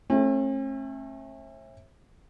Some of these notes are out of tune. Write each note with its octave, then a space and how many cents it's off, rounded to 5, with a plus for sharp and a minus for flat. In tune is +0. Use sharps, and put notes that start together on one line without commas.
A3 -5 C#4 -45